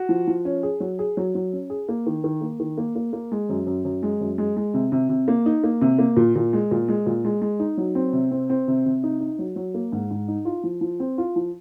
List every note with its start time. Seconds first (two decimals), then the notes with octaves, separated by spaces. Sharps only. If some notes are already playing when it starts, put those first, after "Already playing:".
Already playing: F#4
0.09 F3
0.27 F3
0.45 C#4
0.63 G#4
0.80 F#3
0.99 G#4
1.17 F#3
1.35 F#3
1.53 C#4
1.70 G#4
1.89 A#3
2.06 D#3
2.24 D#3
2.41 A#3
2.60 D#3
2.78 A#3
2.96 A#3
3.13 A#3
3.32 G#3
3.49 F#2
3.66 F#2
3.85 F#2
4.03 G#3
4.20 F#2
4.38 G#3
4.57 G#3
4.74 C3
4.92 C3
5.09 C3
5.28 A#3
5.46 D#4
5.64 A#3
5.81 C3
5.99 A#3
6.16 A#2
6.35 A#2
6.53 G#3
6.71 A#2
6.88 G#3
7.06 A#2
7.25 G#3
7.42 G#3
7.60 D#4
7.78 F#3
7.95 C4
8.13 C3
8.31 C4
8.50 C4
8.68 C3
8.86 C3
9.04 D#4
9.20 D#4
9.39 F#3
9.56 F#3
9.74 A#3
9.92 G#2
10.11 G#2
10.28 D#4
10.45 F4
10.64 F3
10.81 F3
11.00 C4
11.18 F4
11.36 F3